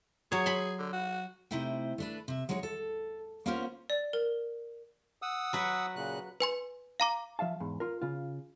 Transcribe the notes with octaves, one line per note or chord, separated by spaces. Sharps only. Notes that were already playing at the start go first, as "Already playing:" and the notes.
F#3 G#4 C#5
B5 C6
D3
F#4
C3 A3 D#4 E4 C5 G5
A3 D4 B4
C3 E5
F#3 G#3 D#4 C#5
A4
A#3 B3 C#4 F4 A#4 C5
D5
A#4
F#5 D#6 E6
F#3 B4
A#2 C#3 F#6
B4 G#5 C6
F5 A#5 D6
F3 E5 F5 A5
E2 G#2
F4 A#4
C#3 F4